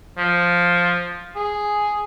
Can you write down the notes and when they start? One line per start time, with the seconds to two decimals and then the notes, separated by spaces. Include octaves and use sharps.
0.18 F3
1.36 G#4